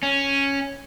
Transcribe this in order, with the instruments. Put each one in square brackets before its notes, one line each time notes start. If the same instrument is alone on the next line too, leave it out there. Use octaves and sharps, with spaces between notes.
[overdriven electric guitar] C#4